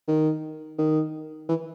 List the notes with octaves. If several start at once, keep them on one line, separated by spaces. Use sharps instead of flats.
D#3
D#3
E3